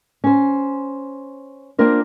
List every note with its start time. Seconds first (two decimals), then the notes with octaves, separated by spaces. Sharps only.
0.24 C#4 C5
1.78 A#3 C4 D4 F4 A#4 C5